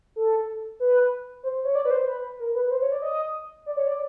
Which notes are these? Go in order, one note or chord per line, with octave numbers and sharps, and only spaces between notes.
A4
B4
C5
C#5
D5
B4
C5
B4
A#4
B4
C5
C#5
D5
D#5
D5
C#5
D5